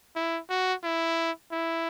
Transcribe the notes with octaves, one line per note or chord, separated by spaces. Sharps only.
E4
F#4
E4
E4